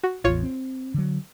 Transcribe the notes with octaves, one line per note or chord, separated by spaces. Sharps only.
F#4
A1 E2 F4 C#5
C4
D3 F#3